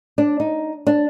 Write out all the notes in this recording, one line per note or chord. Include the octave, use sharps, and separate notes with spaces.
D4
D#4
D4